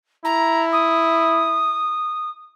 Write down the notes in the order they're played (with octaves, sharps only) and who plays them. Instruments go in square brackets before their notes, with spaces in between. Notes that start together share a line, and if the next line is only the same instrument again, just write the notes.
[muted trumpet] E4 [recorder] A#5
[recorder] D#6